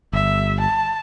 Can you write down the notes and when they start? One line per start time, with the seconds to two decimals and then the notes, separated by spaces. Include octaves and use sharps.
0.13 G1 E5
0.60 A5